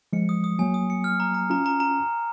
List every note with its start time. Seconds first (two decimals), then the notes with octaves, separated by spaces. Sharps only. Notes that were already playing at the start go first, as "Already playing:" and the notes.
0.13 F3 G#3 C#7
0.29 D#6
0.44 D#6
0.59 F#3 A#3 G#5
0.74 D#6
0.90 C#7
1.04 F6
1.20 A#5
1.35 A#5
1.50 C#4 F4 A#5
1.66 A#5
1.80 A#5